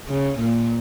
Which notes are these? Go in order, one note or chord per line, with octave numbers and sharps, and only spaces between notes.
C#3
A#2